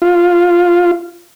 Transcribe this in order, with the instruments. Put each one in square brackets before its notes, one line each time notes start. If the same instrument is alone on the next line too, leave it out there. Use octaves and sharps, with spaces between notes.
[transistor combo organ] F4